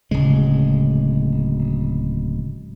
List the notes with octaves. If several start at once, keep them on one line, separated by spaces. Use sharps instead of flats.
D1 C#3 G#3